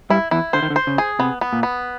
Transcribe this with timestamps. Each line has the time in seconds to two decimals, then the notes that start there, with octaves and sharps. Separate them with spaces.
0.10 G2 G3 E4
0.31 E2 E3 E4
0.53 D3 C5
0.62 D#3
0.70 D3
0.76 C5
0.87 C#3
0.98 G#4
1.19 C3 B3
1.41 B3
1.53 A#2
1.63 B3